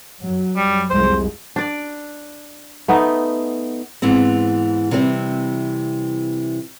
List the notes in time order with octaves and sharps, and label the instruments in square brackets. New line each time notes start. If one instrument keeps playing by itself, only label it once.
[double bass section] F#2 F#3
[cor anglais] G3
[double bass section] C2 F2 G#3 [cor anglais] C5
[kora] D4 D5
A3 B3 D#4
[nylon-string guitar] G#2 E3 B3 C4
C3 E3 G3 C4